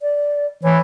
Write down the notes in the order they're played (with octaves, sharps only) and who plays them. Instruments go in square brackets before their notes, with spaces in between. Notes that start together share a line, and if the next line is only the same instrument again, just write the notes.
[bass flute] D5
[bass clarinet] E3 [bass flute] C#5